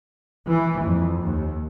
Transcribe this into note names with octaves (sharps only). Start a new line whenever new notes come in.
E3
F2
D#2